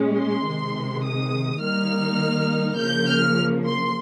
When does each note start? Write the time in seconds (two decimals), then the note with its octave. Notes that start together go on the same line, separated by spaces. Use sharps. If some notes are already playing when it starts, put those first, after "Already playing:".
Already playing: A#2 G#3 C#4
0.17 C6
0.46 C3 D#3 G#3
1.04 D#6
1.61 D#3 G3 A#3 D#4 F6
2.77 C#3 F3 A#3 G6
3.07 F6
3.65 C6